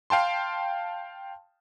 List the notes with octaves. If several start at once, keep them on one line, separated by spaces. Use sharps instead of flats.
F5 G5 A5 C6